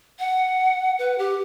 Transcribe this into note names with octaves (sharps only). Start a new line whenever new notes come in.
F#5
B4
G4